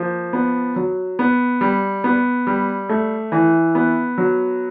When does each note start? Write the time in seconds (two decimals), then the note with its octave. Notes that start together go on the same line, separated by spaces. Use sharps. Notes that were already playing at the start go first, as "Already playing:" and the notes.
Already playing: F3 A#3
0.33 B3
0.76 F#3
1.19 B3
1.61 G3
2.04 B3
2.47 G3
2.89 A3
3.32 E3
3.75 B3
4.18 F#3